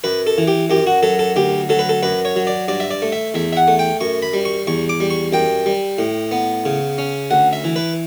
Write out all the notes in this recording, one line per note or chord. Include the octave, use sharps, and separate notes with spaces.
F#2 B4
A4
E3
G4
F#2 G4
F#4
F#3 A4
A4
D2 G4
F#3 A4
B4
A4
F#2 B4
C#5
F#3
D5
G2 D5
E5
D5
A3
E5
E2 E5
E5
F#5
A3
G5
F#2 C#6
B5
G3
C#6
E2 C#6
D6
G3
C#6
F#2 G5
G3
A2
B3
C#3
C#4
D2 F#5
E5
E3
B4